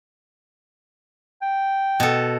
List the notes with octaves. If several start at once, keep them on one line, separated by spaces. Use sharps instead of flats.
G5
B2 A4